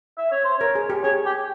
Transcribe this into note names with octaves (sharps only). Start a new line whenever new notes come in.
E5
C#5
C5
A#4 C#5
G#4
G4
G#4 C#5
G4